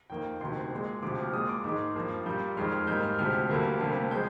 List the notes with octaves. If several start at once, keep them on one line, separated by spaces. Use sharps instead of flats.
F2 D#3 A#3 G5
D2 C3 D#3 C6
A#2 G#3
D2 C3 F3 D6
F6
A#2 G#3 D#6
D6
G#2 D#3 G#3 D6
G2 F3 A#3
A#2 G3 A#3 G6
F2 D#3 G#3 F6
F6
G#2 G3 A#3 G6
F6
D2 C3 F3 G#3 F6
D2 D3 G3 A#3
D2 C3 G3 A#3
F3 G#3 G6